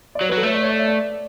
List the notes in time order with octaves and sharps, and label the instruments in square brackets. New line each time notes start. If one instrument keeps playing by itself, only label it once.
[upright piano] D5
[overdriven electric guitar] F#3 [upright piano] C#5
[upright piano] B4
[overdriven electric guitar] F#3 [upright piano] A4
[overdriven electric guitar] A3 [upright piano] C#5
[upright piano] D5
C#5
D5
E5
D5